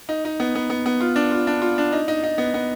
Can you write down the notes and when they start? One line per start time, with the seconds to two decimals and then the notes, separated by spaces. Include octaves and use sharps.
0.09 D#4
0.25 D#4
0.40 B3
0.55 B3
0.70 B3
0.86 B3
1.00 F4
1.16 D4
1.31 F4
1.47 D4
1.62 F4
1.78 D4
1.92 D#4
2.08 D#4
2.23 D#4
2.38 B3
2.54 B3